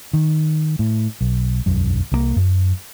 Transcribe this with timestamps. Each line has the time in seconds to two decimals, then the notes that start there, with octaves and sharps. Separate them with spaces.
0.13 D#3
0.79 A2
1.21 B1
1.66 E1 B1 F#2
2.12 C2 F3 A#3
2.37 F#2